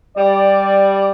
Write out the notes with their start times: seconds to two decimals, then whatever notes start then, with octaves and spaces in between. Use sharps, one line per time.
0.18 G3 D5